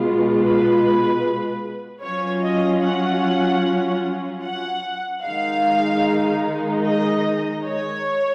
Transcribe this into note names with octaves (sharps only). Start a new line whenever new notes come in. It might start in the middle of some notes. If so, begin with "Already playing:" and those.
Already playing: B2 G#3 B3 F4
B4
F#3 C#4 F4 C#5
D#5
F#5
F#5
D#3 G#3 D#4 F5
D#5
C#5